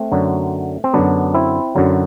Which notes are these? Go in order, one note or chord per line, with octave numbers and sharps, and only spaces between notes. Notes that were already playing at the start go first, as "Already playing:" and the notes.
Already playing: A3 C4
F#2 D3 F#3
C4
F#2 D3 F#3 B3 D4
C4 E4
F#2 D3 F#3